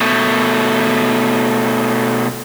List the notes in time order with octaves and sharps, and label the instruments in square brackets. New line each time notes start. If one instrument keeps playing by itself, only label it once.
[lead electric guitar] B2 A3